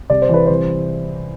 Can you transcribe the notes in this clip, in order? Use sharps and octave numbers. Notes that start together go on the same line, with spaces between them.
C2 D5
C5
E3 B4
C2 C5